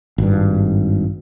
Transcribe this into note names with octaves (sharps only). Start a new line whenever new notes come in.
G#1 G2